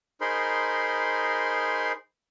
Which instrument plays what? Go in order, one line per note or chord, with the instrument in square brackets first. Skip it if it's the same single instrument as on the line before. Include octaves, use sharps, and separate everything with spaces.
[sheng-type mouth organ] D#4 G#4 A#4 C5 B5 C6